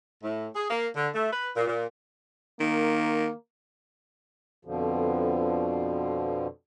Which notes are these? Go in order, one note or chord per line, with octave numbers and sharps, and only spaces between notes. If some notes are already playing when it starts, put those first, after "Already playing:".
A2
G#4
A#3
D3
A3
B4
A#2
A#2
D#3 A#3
F2 B2 D3 F3